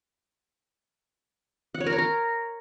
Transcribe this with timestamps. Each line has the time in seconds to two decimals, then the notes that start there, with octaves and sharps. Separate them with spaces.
1.75 F#5
1.81 C#5
1.86 A#4
1.92 C#5
1.98 A#4